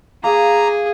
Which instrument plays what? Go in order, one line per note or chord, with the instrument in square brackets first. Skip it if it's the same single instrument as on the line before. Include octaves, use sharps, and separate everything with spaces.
[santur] A#3 [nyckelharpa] G#4 [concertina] A#5